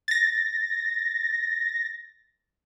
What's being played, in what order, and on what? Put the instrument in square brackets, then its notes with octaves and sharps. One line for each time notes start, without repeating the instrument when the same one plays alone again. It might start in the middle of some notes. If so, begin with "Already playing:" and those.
[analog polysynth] A6 A#6